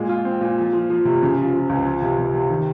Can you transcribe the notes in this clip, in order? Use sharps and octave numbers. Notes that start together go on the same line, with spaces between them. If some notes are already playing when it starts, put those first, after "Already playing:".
Already playing: A#2 G#3
F4
C4
A#2
F3
F3
F3
C3
C#3
F3
F3
C#2
F3
C3
C3
C3
D#3